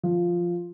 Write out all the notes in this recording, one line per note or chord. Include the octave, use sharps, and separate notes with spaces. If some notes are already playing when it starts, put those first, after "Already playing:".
F3